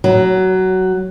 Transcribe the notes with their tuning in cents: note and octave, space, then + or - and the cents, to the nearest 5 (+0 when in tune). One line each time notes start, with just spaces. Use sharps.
F#3 +15